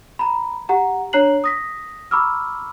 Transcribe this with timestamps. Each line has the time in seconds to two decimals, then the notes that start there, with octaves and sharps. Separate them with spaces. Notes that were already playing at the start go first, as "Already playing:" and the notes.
0.19 A#5 B5
0.69 G4 F#5 A#5
1.13 D4 C#5 A#5 F#6 C7 F#7
1.44 D#6 A#6 B6
2.11 A#5 B5 C#6 D6 E6 F6